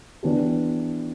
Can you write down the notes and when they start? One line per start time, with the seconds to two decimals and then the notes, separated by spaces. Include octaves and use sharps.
0.23 E3 B3 D4 G4